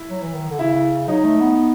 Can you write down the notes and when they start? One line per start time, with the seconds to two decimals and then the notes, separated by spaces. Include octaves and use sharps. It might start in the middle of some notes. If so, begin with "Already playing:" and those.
Already playing: E4
0.10 F#3
0.22 E3
0.34 D#3
0.50 D3
0.59 C#3 E4
1.08 F#3 D#4
1.24 A3
1.41 B3